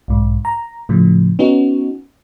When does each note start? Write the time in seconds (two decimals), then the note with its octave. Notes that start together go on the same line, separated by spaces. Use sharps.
0.08 B1 G#2
0.45 A#5
0.89 A2 C#3 F3
1.39 B3 C#4 D#4 F#4